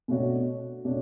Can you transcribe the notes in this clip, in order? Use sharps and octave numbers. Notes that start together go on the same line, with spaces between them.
B2 A3 D4 F#4 C#5
B2 A3 D4 F#4 C#5